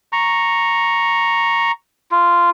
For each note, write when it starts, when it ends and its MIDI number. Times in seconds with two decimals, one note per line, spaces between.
0.13 1.72 82
0.13 1.72 85
2.11 2.50 65